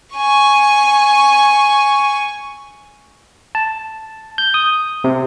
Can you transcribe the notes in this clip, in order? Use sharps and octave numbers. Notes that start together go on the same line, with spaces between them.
G#5 C#6
A5
G6
D#6
C3